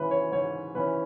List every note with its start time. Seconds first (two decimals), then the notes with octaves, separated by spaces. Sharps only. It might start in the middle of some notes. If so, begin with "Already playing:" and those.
Already playing: G#2 E3 C#4 B4
0.11 C#5
0.32 G#2 C#5
0.75 E3 C#4 B4